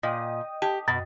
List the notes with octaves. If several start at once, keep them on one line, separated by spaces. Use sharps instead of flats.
A#2 D#5 G5 D#6
G4 A5
F#2 B2